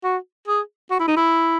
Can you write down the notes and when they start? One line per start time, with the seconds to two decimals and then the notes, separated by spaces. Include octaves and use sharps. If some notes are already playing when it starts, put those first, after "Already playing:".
0.04 F#4
0.48 G#4
0.91 F#4
0.99 E4
1.08 D#4
1.16 E4